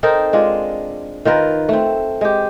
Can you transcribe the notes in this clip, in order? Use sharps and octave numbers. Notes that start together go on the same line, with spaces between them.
C4 D#4 A4 A#4
G#3 D4 F4
D#3 F4 A#4 B4
A3 C4
G#3 G4